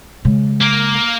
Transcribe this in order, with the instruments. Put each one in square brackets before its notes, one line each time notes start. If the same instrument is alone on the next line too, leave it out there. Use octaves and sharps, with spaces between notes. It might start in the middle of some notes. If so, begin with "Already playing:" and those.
[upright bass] C#3 G#3
[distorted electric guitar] A#3